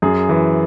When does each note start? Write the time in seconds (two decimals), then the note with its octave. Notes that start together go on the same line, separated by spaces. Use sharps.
0.02 F#2 G#4
0.29 E3